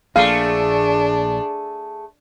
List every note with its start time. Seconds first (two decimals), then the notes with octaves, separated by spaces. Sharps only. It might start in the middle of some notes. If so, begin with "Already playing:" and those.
0.16 A#1 A#2 A3 D4 G#4 F5